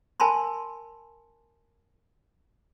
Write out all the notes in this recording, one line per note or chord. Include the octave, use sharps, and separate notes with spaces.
A#4 G#5 A5 B5 C6